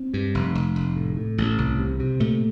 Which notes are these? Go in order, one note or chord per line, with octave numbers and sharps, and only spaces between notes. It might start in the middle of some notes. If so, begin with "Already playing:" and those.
Already playing: C4
G2
F1
F1
F1
A2
A2
A1
C2
C3
C3
A#2 A3